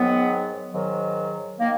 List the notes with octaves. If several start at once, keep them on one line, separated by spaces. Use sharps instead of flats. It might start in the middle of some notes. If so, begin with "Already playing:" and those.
Already playing: G#2 D#3 F#3 B3
G#2 D#3 F#3
D#3 A#3